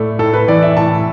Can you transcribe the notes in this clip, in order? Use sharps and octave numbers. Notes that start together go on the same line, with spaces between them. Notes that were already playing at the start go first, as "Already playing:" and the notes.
Already playing: A2 A3 D5
A2 A4
B4
E3 D5
E5
A2 A5